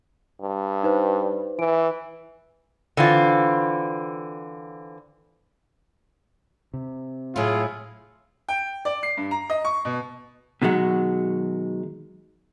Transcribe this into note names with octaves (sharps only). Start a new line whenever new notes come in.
G2
D#4 B4 C5
E3 D7
D3 E3 C4 F4
C3
A2 F#3 E4 F4 G#4
G5
D5
C7
G2
A#5
D#5
C#6
B2
B2 D#3 F#3 G#3 F#4